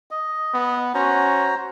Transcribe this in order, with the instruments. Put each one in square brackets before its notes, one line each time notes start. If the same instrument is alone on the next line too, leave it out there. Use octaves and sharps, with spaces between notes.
[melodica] D#5
[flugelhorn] B3
[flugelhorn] C#4 [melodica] F#4 C5 A#5